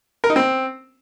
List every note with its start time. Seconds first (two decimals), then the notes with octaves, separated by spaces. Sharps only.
0.24 A#4
0.30 D#4
0.36 C4